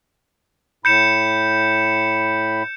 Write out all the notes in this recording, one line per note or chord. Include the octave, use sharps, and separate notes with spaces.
A2 B5 G6 C#7 E7